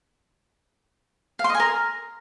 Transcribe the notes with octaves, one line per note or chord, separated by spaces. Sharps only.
F5
C6
D#5
G#5
A#4